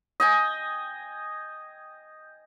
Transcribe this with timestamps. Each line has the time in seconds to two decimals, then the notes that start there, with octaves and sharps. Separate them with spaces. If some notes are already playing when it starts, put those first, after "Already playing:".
0.20 D#5 G5 G#5